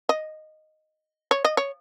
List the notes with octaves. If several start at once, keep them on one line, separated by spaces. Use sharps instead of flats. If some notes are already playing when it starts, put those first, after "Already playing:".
D#5
C#5
D#5
C#5